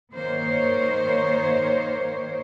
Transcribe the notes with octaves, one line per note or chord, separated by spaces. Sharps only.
D#3 A#3 C5 C#5